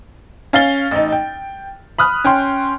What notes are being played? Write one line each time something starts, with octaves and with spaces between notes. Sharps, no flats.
C#4 F5 A6 G7
A1 D#4
G5
B5 D#6 F6 F#6
C#4 G5 C6